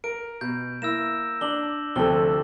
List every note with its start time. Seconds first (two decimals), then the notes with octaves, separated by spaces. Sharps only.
0.04 A#4 D7
0.41 B2 G6
0.82 A#3 E4 E6 A#6 E7
1.41 D4 F#7 G7
1.96 D2 C3 F3 C4 A4 G7